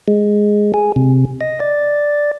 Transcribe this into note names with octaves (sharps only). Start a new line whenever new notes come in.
G#3
G#4
C3
D#5
D5